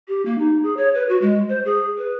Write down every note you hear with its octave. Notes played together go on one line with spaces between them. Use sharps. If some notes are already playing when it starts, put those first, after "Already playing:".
G4
A#3
D#4
G#4
C#5
B4
F#4
G#3
C5
G#4
B4